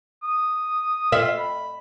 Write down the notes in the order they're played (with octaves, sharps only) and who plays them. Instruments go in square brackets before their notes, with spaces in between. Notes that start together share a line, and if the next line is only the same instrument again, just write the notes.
[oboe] D#6
[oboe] F4 [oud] E5
[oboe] B5